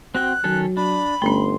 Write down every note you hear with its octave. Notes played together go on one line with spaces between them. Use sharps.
C4 F#4 G5 F#6
D#3 F#3 C#4 A4
D4 B5
G1 A3 C#4 C6